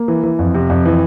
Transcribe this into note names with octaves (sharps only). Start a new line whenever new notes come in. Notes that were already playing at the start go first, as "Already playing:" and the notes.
Already playing: A#3
E3
E3
F2
C3
F2
E3